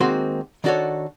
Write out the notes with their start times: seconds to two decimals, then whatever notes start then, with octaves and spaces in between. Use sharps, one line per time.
0.01 D#3 G#3 A#3 C4 F#4 C6
0.64 D#3 D4 F#4 A4 C#5